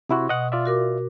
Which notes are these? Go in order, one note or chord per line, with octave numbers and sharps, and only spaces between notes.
C3 E4 F#4 F#5 C6 C#6
B2 D#5 F#5
F4 D5 E5
F#4 A#4 D6